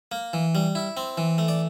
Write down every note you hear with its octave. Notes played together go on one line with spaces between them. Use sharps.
A#3
E3
G3
E4
C4
E3
A3
D5